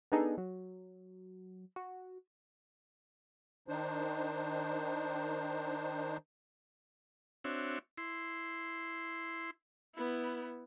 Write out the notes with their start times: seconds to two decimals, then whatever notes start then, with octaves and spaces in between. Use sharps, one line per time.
0.12 B3 D4 D#4 G#4 A4
0.38 F#3
1.76 F#4
3.68 D#3 D4 D#4 C5
7.44 C4 D4 F#4 C#5 E5
7.98 E4 C6
9.95 B3 E4